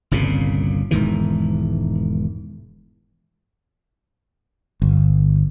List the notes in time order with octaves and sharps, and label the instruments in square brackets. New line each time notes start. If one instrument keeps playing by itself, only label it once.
[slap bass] G1 C2 A#2 C#3
E1 G#2 D#3 E3
[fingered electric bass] G1